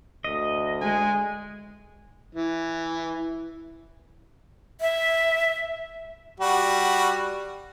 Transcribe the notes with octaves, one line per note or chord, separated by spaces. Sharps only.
D2 D#5
G#3 G#5
E3
E5
G3 F#4